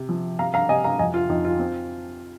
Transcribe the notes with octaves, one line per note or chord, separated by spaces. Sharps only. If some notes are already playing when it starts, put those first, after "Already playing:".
Already playing: C3
F3
C3 F5 A#5
F5 A#5
C3 D#5 G#5
F5 A#5
F2 D#5 G#5
F4
F2 D#4
F4
C4